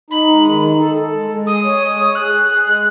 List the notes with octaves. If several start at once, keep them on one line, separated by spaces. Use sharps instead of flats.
D#4 B5
G#3
D#3
D#4
A4
A4
G#3
G#3
G#4 D#6
C#5
G#3
C#5
G#4 F#6
G#4
G#4
G#3